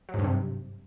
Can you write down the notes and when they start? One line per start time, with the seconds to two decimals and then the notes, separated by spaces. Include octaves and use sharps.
0.09 F#3
0.14 G#2
0.19 G2
0.24 C3